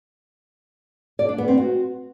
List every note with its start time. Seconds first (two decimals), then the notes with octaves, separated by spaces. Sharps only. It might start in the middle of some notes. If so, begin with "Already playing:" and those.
1.19 D5
1.29 D4
1.38 B3
1.48 C4
1.58 F#4